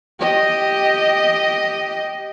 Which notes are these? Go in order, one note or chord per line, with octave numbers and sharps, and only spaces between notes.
G4 D#5